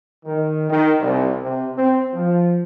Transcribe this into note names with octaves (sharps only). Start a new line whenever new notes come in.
D#3
D#3
C2
C3
C4
F3